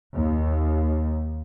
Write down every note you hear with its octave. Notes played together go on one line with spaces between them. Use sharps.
D#2